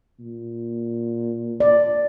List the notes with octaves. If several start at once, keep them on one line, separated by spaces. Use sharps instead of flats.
A#2
D5